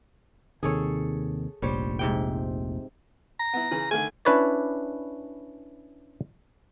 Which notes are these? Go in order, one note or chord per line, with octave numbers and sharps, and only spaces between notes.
D#2 C3 D#3 G#4 A4 C#5
F1 A#1 G3 C5 C#5
G#2 C3 G5
A#5
B3 E4
C#3 E3 B4
D3 D#3 A3 G#5
C#4 D4 E4 B4 C#5 D5